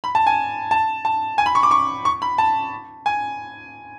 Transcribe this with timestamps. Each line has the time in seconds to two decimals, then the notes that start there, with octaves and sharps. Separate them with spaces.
0.04 B5
0.15 A5
0.27 G#5
0.71 A5
1.05 A5
1.38 G#5
1.46 B5
1.55 C#6
1.63 D6
1.71 C#6
2.05 C#6
2.22 B5
2.38 A5
3.06 G#5